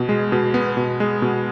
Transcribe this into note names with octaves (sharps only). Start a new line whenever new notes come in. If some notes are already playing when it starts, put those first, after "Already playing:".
Already playing: B2 B3
G#3
B2
B3
B2
G#3
B2